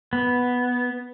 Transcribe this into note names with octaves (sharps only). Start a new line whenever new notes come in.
B3